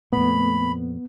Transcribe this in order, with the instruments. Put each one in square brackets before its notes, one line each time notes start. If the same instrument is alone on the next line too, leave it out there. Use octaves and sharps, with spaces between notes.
[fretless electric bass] F2 A#2 [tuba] A3 [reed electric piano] B3 [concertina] B5